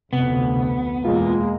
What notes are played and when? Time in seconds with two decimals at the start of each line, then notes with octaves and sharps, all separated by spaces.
0.13 F1 D2 C3 B3
1.05 E2 B2 G#3 A#3 F4